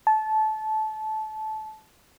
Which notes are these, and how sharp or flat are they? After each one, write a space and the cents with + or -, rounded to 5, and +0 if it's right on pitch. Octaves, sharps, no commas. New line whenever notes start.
A5 -20